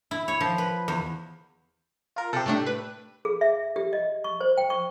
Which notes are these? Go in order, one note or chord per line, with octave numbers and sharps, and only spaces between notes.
E4
C#5
F3
B4
E2
F4 A#4
C3 G4 A4
A2 A3 D4
B4
G#4
E5
G4
D#5
C#6
C5
G5
C#6